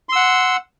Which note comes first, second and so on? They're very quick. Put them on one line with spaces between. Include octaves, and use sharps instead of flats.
C6 E6 F#5